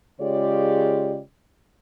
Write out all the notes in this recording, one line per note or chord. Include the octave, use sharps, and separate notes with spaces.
C#3 G#3 F4 G4 C#5 D5